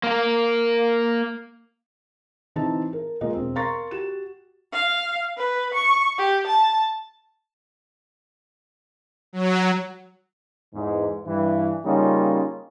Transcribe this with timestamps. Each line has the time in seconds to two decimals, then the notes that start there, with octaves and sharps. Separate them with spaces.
0.03 A#3 A#4
2.56 E3 C4 D#4 A5
2.93 A#4
3.21 G#3 A#3 F4 A#4 D#5
3.33 E1 C4
3.55 A#4 F5 A#5 C6 C#6 A6
3.91 F#4 G4 E7
4.73 F5
5.37 B4
5.74 C#6
6.18 G4
6.47 A5
9.33 F#3
10.74 E2 G#2
11.26 G2 E3
11.85 C#3 G3 A#3 C#4 D#4 F4